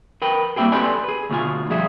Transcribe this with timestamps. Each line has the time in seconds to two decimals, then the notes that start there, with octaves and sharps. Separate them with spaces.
0.22 A#4 B4 G5
0.56 G3 A#3 C4 E4 G4 G#4
0.72 C4 G4 A4 B4 D5 G#5
1.04 G#4 B4
1.30 D2 B2 F3 F4 G#5
1.70 F3 G3 G#4 E5